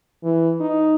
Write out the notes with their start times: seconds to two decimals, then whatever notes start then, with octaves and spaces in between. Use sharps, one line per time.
0.24 E3
0.60 D#4